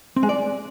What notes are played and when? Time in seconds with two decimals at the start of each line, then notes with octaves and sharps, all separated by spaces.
0.16 C4
0.23 G#3
0.29 D5